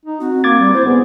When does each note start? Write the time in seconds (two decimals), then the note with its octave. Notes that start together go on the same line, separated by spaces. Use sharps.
0.05 D#4
0.21 C4 F#4
0.44 A#3 D6 G#6 A6
0.59 G3
0.74 E4 C5
0.86 B3 G#4